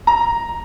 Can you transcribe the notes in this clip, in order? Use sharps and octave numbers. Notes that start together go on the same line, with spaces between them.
A#5